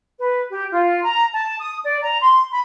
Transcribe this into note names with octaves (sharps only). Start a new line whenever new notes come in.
B4
G4
F4
A#5
A5
D#6
D5
A#5
C6
B5